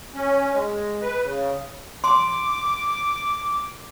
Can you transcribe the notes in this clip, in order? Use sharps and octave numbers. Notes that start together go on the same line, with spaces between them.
C#4
G#3
B4
C#3
C6 D6